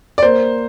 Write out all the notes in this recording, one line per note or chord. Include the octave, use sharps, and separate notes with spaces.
D5
A#3 C5